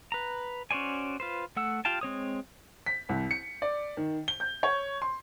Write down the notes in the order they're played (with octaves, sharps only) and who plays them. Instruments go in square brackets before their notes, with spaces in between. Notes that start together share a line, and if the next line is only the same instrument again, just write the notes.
[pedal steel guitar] B4 A#5
C#4 F#4 C5 D5 G#5
F4 B4 C5
A3 F#5 E6
F4 G4 F5 G5 A5
G#3 C4 C#5 D#6
[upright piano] B6
C2
C#7
D5
D#3
G7
G6
C#5
C6